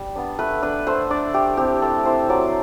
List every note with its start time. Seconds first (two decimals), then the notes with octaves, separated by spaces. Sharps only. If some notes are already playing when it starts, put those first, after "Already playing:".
Already playing: G3
0.16 B3 D4
0.39 A3 B4
0.62 D4 B4
0.87 A3 C5
1.10 D4 D5
1.34 A3 G4
1.57 C4 E4 G4
1.82 A3 A4
2.05 C4 E4 C5
2.29 F#3 D5